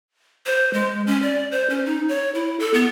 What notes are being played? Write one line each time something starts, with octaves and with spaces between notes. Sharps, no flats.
C5
G#3
C#4
D5
C5
C#4
D#4
C#5
E4
A4
B3